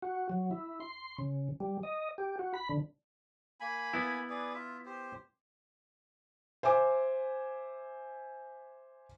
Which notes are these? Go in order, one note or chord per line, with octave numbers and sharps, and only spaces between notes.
F#4
F#3
E4
C6
C#3
G3
D#5
G4
F#4
B5
D3
A#3 G#5 B5
B3 E4
G#4 B4 D5
F4 E5
G4 C5
C5 E5 G#5 D6